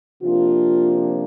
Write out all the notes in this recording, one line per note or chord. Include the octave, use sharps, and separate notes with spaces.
C3 F3 A#3 D4 F4